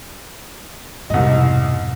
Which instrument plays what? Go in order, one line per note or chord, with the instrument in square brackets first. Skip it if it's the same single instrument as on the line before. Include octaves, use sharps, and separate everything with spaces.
[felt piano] C2 D#5 [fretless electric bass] F2 G#2 B2